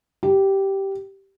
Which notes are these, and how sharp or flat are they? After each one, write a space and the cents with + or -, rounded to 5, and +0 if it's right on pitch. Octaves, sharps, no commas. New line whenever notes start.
G4 -10